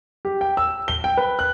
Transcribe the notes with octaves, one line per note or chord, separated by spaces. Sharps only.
G4
G5
E6
G7
G5
B4
F#6